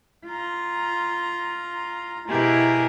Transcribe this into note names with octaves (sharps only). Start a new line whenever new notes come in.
F4 A#5
B2 E4 G4 G#4 A#4